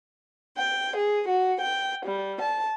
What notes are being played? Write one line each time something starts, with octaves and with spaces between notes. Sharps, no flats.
G5
G#4
F#4
G5
G3
A5